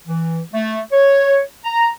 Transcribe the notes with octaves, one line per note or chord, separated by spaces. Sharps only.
E3
A3
C#5
A#5